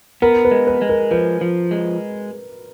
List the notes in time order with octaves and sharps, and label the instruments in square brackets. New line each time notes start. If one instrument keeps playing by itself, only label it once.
[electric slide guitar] B3 [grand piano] A#4
[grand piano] B4
[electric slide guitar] G#3
[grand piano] B4
[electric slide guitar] G#3
[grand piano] A#4
[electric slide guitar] F3 [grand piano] B4
[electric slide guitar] F3
G#3